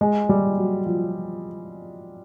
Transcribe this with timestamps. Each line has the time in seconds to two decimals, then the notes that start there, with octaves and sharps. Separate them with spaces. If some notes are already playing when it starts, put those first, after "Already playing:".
0.01 G#3
0.29 G3
0.58 F#3
0.86 F3